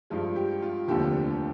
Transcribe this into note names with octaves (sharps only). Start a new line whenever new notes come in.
G2 F3 G#3 F4
G4
F4
F1 D#2 D3 F3 G4